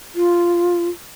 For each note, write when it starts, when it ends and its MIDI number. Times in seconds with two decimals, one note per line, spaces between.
0.15 0.88 65